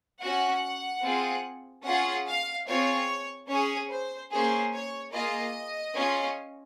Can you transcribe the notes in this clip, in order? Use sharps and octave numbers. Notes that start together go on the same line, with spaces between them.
C#4 F#4 F#5
C4 F4 G#4
C#4 F4 G#4 F#5
F5
C4 F4 G#4 C#5
C#4 G#4 C#5
C5
A#3 C#4 G#4 C5
C#5
A#3 F4 G#4 D#5
C#4 F4 G#4